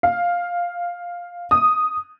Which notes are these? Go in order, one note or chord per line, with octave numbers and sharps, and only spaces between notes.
F5
D#6